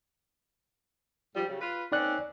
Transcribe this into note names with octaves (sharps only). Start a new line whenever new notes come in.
G#2 F3 G3
C#3 F#3 G3
F4 B4
A#3 C4 C#4 D#4 D5 F#6